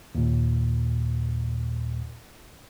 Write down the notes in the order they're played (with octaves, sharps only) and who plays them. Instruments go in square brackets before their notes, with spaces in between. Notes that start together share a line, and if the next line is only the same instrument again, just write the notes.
[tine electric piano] D#2 A#2